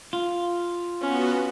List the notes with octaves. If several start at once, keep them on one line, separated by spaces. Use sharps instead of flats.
F4
B3 C#4 F#4